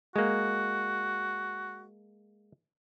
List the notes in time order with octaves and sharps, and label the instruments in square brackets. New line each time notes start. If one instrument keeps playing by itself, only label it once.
[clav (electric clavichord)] G#3 A#3 [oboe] F#4